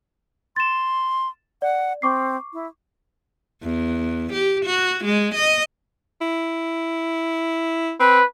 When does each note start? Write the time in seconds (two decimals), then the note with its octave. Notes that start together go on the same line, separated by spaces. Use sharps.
0.56 C6 A6 E7
1.62 D5 F#5
2.02 C4 C#6 D6 C7
2.53 E4
3.63 E2
4.33 G4
4.66 F#4
5.05 G#3
5.35 D#5
6.21 E4
8.00 C4 B4